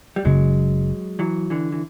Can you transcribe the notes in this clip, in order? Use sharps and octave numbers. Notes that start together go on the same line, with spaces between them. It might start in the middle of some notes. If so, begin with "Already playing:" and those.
G3
F#1 F#2 C#3 F#3 G#3
E3 F#3
D3 E3
E3